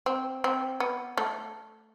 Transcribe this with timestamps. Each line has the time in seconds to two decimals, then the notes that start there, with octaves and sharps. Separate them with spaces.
0.06 C4
0.44 C4
0.80 B3
1.17 A3